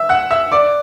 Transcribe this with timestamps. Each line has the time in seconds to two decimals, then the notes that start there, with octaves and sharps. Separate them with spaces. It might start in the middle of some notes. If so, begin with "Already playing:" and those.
Already playing: E5 E6
0.09 F#5 F#6
0.31 E5 E6
0.52 D5 D6